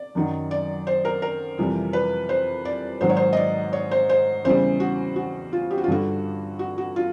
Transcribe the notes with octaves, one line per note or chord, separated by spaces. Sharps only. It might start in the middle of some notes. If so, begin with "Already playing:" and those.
Already playing: D5
F#2 D#3 F#3
D5
C5
A#4
A#4
F2 C3 E3 G3
B4
C5
D5
G#2 D#3 F#3 C5
C#5
C5
D#5
D5
C#5
C5
C5
E2 C#3 E3 G3 C5
F#4
F#4
F4
G4
F#4
F4
G2 D3 G3 F#4
F#4
F#4
F4